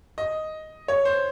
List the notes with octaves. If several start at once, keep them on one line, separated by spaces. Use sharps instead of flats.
D#5
C#5
C5